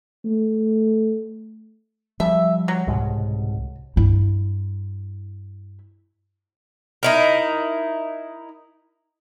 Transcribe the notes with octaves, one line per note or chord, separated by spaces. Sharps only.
A3
F3 G3 E5
F#3
C2 G#2 B2
G2 E4
D#4 E4 A#4